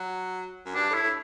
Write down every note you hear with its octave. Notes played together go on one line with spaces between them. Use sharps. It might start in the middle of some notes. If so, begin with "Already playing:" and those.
Already playing: F#3
F#2
G2 D4
A2 E4
A2